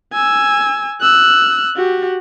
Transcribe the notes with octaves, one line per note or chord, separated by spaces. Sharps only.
G#5 E6
E6 F#6
F#4 G4